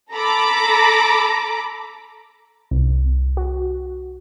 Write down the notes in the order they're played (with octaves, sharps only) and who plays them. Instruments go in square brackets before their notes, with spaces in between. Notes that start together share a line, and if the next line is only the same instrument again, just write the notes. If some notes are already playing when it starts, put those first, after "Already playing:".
[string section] A4 A#5 B5 D6
[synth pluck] C2
F#4